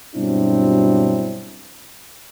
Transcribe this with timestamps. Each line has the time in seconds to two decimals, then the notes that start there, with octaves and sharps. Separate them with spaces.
0.15 G2 B2 F#3 C4 D4 E4